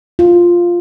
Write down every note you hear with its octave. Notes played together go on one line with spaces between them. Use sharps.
F4